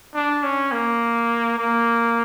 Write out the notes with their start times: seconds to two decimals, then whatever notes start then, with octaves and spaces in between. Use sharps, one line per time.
0.15 D4
0.43 C#4
0.72 A#3
1.58 A#3